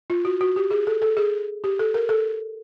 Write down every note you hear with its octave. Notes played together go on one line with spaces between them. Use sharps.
F4
F#4
F#4
G4
G#4
A4
A4
G#4
G4
A4
A#4
A4